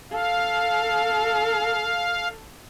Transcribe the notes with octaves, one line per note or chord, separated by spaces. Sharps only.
A4 F5